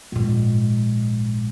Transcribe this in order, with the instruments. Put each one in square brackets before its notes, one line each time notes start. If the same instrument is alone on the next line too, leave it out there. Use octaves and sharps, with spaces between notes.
[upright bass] A#1 G#2